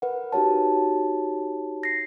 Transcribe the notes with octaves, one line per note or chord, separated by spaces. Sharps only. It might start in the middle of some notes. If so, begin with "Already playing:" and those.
A#4 B4 F#5
D#4 F#4 G4 C#5 A5
A#6 C7